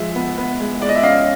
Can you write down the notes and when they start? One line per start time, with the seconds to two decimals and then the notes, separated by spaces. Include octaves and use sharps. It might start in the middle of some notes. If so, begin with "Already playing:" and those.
Already playing: F3 G#3 E5
0.15 B3
0.38 B3
0.60 G#3
0.81 G#3 D5
0.89 D#5
0.95 E5
1.03 C#4 D#5 F5